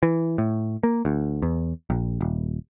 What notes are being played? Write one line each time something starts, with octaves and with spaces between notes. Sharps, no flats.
E3
A2
A#3
D2
E2
A#1
D#1